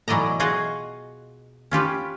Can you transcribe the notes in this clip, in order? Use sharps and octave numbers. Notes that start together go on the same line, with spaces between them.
B2 E3 F#3 D5 D#5 A#5
F4 F#4 G#4 D#5 F5 F#5
C#4 F4 G4 B4